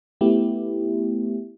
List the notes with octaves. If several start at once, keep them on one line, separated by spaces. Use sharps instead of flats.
A3 B3 E4 G4